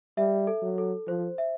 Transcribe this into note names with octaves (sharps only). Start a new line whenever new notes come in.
G3 E5
A4
F#3
A4
F3 C5
E5